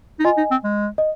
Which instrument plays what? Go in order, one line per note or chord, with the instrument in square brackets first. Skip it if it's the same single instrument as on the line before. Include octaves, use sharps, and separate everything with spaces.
[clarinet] D#4
[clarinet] F4 [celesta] D#5 G#5
[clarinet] D#4
C4
G#3
[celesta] D#5